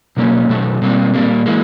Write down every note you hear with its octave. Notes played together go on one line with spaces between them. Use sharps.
B2 F#3 A#3 C#4
B2 F#3 A3
B2 G3 A#3 C4
A#2 G3 A#3
E3 G#3 A#3